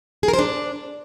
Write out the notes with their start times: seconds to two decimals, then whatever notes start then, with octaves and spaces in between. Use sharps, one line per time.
0.23 G#4
0.28 A#4
0.33 C5
0.39 D4